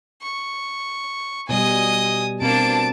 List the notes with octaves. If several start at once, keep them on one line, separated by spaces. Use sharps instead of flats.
C#6
B2 G3 D#5 G#5 D#6
B2 A#3 C4 D4 A5 D7